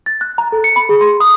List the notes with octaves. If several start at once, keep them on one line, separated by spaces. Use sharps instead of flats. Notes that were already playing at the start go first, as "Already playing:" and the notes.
A6
F#6
A#5
A4
C#7
B5
G#4
C6
D#6